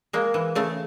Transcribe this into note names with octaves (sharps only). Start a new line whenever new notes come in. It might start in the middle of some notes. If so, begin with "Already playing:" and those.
G#3 A#3
E3
C#3 A3